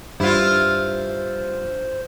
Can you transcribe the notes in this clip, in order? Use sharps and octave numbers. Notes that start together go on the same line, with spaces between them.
G2 E4 F4 C5